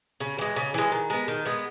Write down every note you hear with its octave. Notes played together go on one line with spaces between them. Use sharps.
C#3
E3 G#3
C#3
E3 G#3
D#3
G#3 B3
D#3
G#3 B3